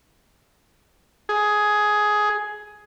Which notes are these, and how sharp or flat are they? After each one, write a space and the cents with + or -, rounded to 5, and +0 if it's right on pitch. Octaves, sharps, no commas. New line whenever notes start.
G#4 +10